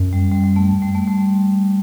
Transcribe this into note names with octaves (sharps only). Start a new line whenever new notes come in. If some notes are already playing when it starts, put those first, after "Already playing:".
Already playing: F#2
G3
G3
G3
A3
G3
A3
G3